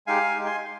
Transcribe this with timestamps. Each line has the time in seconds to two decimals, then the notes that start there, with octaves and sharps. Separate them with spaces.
0.07 G#3 D#4 G4 F5 G#5
0.37 G#3 D#4 G4
0.46 G#5 C6